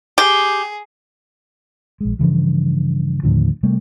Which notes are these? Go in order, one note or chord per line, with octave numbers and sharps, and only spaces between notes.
G4 G#4
A#1 G#3
G2 C#3 E3 F3
D#2 A2 D3 F3
C3 G3 A3 A#3